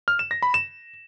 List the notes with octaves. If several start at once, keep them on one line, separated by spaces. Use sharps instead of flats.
F6
E7
A#6
B5
E7